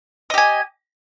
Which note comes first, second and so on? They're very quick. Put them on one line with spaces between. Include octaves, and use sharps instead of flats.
D#5 G4 G#5